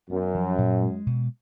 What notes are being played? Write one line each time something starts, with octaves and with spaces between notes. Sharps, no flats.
F#2 B3
F3
A#2
G#3
B2